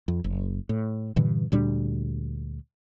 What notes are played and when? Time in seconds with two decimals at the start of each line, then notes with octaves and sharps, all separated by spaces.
0.08 F2
0.24 F#1
0.69 A2
1.16 G2 A#2 D3 E3
1.52 D2 A#2 G3 D4